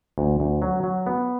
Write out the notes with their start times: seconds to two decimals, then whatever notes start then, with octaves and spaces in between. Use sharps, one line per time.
0.18 D2
0.40 D2
0.62 F#3
0.84 F#3
1.06 B3